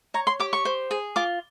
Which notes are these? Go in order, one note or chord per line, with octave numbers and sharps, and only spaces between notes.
C#5 A#5
C6
G4 D6
C#6
C5
G#4
F4 D6